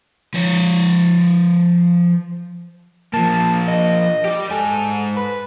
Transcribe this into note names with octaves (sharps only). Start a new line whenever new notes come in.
F3 C#5
F3 A#3 A5
D#5
G4 D5
G#2 A4 G#5
B4